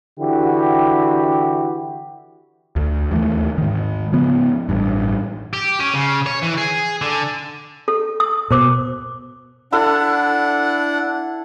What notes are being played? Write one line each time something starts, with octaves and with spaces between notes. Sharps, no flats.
D3 E3 E4 F#4 G4
D2
D#2 E3 G#3 A3
G#2 D#3
C#3 F3 B3
A1 G2
G4
C#4
C#3
C#5
E3
G#4
D3
A4
D#6
B2 A#4 C5 D6
D4 E4 A4 F#5